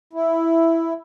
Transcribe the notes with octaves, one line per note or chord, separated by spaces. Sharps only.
E4